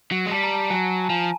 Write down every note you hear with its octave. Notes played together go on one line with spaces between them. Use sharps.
F#3
G#3
G3 A5
A#5
A5
F#3 G#5
A5
F3 G#5